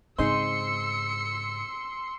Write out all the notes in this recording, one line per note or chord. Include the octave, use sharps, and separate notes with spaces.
G#2 C#3 C4 D#4 G#4 C6 E6 C#7